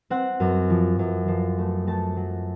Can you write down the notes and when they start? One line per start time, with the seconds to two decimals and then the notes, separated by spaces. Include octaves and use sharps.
0.10 C4 F#5
0.40 F#2
0.70 F3
0.99 F#2
1.28 F3
1.58 A3
1.87 A3 A5
2.17 F#3